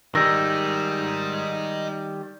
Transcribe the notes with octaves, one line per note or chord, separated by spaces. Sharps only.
D#3 G3 G#3 D#4 E6 A#6